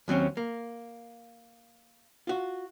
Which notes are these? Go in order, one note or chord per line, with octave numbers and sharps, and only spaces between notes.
D#2 F#3 C4 C#4
A#3
F4 F#4